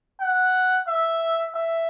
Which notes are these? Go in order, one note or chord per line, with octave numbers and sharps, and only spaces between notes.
F#5
E5
E5